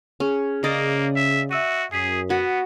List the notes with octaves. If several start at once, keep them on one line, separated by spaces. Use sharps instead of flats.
C#4 G#4
C#3 A#3 D5 D#5
E5
F#4 E5 E6 D#7
F#2 G#4 D#6 B6 C7
B3 F#4 F#5